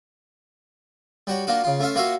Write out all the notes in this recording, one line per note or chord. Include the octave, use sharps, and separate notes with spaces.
G3 F#4 C#5
A#3 D4 F4 F#4
C#3 F4
A3 C#4 F4 E5 F5
A#3 F4 F#4 C#5 E5 F5